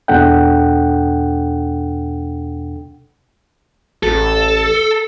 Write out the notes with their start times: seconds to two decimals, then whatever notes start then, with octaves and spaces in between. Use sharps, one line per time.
0.08 E2 B2 D4 A4 F#5 G5
4.03 A1 A4